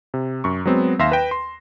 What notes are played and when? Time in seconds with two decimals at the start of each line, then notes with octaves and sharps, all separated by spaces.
0.14 C3
0.44 F#2 C#6
0.65 F#3 G#3 B3 C4
0.99 D#2 E5 F5 C6 A#6 E7
1.12 B4 G5 A#6
1.31 C6